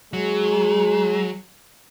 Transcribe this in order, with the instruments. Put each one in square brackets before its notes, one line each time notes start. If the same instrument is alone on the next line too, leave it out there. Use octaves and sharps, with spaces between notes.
[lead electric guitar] F#3 [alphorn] G#3